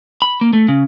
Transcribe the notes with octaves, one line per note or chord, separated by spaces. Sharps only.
B5
A#3
A3
C#3